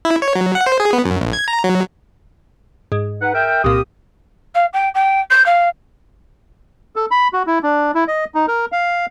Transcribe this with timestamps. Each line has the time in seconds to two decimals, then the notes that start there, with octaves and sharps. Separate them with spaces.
0.05 E4
0.22 C#5
0.35 F#3
0.55 F#5
0.67 C5
0.80 G#4
0.93 B3
1.05 F#2
1.21 A#1
1.33 G#6
1.48 A#5
1.64 F#3
2.92 G#2
3.21 D#4 B4 F#5
3.34 A#4 E5 G5
3.64 C2 A#2 G4 D#6
4.55 F5
4.73 G5
4.94 G5
5.30 G6
5.46 F5
6.96 A4
7.11 B5
7.33 F#4
7.47 E4
7.63 D4
7.95 E4
8.08 D#5
8.35 D#4
8.48 A#4
8.72 F5